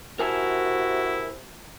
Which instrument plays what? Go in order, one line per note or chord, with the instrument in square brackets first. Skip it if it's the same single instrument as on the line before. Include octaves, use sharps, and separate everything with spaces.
[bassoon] C3 [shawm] E4 [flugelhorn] F#4 [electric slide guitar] A#4 G#5 A5